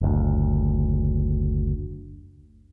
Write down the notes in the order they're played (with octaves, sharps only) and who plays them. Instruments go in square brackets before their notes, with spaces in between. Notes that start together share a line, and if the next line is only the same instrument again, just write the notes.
[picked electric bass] F#1 D2